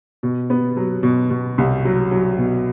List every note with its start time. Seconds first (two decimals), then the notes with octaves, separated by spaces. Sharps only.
0.23 B2
0.50 B3
0.77 F#3
1.03 B2
1.30 B2
1.58 C2
1.85 F#3
2.11 F#3
2.38 B2